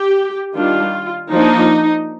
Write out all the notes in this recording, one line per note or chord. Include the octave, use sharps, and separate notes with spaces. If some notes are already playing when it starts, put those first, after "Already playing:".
Already playing: G4
D#3 G3 D4 F4
F3 A#3 D4 D#4